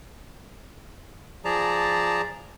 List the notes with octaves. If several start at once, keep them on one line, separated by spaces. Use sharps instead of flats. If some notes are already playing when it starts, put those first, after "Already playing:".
F3 G#4 D5 A5 A#5